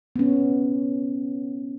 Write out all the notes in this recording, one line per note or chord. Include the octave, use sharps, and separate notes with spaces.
B3 C#4